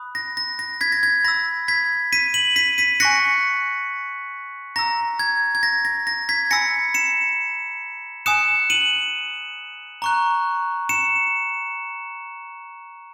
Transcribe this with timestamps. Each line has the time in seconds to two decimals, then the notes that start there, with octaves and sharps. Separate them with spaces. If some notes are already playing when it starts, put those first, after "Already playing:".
Already playing: B5 D#6 F#6
0.15 A#6
0.37 A#6
0.59 A#6
0.81 G#6 B6
0.92 A#6
1.03 G#6
1.24 B5 E6 A#6
1.68 G#6 B6
2.13 B6 D#7
2.34 D#7 F#7
2.56 B6 D#7
2.78 B6 D#7
3.00 G#5 C#6 F#6 A#6 C#7
4.76 A#5 E6 A#6
5.19 G#6
5.55 G#6
5.63 A#6
5.85 A#6
6.07 A#6
6.29 G#6 B6
6.51 G#5 B5 E6 A#6 C#7
6.94 C#7 E7
8.26 G#5 D#6 F#6 C#7 E7
8.70 D#7 F#7
10.02 A#5 C#6 F#6
10.89 C#7 E7